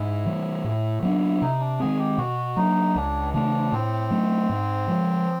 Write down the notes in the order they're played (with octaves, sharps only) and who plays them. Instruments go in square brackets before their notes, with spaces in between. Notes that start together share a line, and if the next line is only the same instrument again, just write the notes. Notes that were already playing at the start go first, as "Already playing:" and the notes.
Already playing: [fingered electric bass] G#2 [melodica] E4
[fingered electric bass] E3 G3
A2
F#3 B3 D4
[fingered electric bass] C3 [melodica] D#4
[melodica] D4
[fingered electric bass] D#3 G#3 C4 [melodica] G#4
[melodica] G4
[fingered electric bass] B2 [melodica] F#4
[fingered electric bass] F#3 A#3 D4 [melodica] D#4
[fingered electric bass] C#2 [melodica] D4
[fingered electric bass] C#3 E3 A3 [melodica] D4
[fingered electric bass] A2 [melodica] C4
[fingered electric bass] F#3 A3 C#4
G#2
F3 G#3